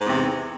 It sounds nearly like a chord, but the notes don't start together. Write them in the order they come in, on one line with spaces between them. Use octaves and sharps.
G#2 E2 C3